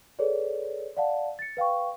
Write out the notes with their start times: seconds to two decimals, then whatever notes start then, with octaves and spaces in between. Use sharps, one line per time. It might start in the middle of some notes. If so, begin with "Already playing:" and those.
0.19 G#4 A4 B4 C#5 D5
0.97 D5 F5 F#5 A5
1.39 A6 C#7
1.57 B4 F5 G5 C#6